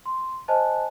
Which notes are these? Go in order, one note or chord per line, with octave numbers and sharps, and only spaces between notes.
C6
C5 D#5 G#5 A5 F#6